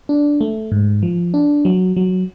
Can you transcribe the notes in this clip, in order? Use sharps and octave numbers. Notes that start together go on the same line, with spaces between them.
D4
A3
G#2
F3
D4
F#3
F#3